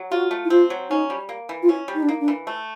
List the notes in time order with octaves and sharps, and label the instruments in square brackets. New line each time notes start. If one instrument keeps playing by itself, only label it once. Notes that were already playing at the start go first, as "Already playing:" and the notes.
Already playing: [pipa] F#3
[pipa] F4 [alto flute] F#4
[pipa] A3
[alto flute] E4
[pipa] C4 [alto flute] F4
[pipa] F#3
[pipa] C#4 [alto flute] D#4
[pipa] G3
A#3
E3
[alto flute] F4
[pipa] C#4 [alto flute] E4
[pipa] G3
[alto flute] D#4
D4
[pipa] A#3 [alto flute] D#4
[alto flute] D4
[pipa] E3
A3